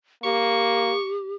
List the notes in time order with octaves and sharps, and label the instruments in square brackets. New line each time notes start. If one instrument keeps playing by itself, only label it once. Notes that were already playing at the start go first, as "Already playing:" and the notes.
[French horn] A#3 [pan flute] G4 [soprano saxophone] C#6